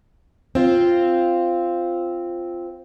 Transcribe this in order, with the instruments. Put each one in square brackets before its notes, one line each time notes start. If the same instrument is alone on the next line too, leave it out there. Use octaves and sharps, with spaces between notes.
[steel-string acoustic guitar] C4 F4